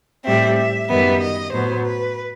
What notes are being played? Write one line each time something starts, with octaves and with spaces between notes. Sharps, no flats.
A2 G3 C4 E5
E5
F#2 D#3 G3 B3 E5
D#5
A2 F#3 B3 C5
B4